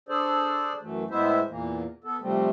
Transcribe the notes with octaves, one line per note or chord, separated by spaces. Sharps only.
D4 G#4 A4 C5 D5
F#2 E3 A3
A2 G#3 B3 E4 C5 E5
E2 A#2 E3 A#3
B3 A4
C3 F3 G3 A3 C4